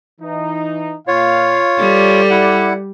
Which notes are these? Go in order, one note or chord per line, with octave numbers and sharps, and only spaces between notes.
E3 D#4
A#2 F4 C#5 F5
G3 A4 D5
E4 F#5